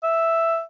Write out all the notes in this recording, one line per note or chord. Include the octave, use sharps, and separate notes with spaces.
E5